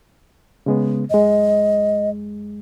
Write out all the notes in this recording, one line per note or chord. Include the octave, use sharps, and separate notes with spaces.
C#3 G#3 B3
F#2 G#3 D#5